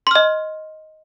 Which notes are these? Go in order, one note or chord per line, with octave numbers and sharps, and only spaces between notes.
D#5 C6 F6